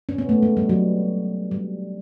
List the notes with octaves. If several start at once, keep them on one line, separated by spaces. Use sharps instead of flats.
C#4
B3
A3
G#3
G3
F#3
G3